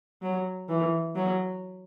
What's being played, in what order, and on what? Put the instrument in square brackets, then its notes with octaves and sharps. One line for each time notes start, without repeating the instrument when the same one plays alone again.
[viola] F#3
E3
F#3